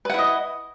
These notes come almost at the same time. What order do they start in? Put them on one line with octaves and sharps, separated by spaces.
B4 F#5 E4 D#5